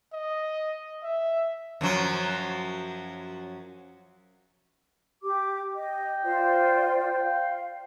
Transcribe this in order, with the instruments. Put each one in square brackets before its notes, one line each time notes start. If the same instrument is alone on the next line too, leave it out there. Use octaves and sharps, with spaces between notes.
[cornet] D#5
E5
[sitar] F#2 F3 F#3
[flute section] G4 D6
[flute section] D#5 [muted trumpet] G5
[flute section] F4 C5 D5
F5